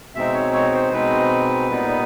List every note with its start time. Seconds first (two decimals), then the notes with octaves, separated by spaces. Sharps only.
0.15 B2 G#3 C4 D#4 E5
0.34 C#5
0.53 C#5
0.73 C5
0.91 B2 G#3 C4 D#4 B4
1.69 A#2 G3 B3 D#4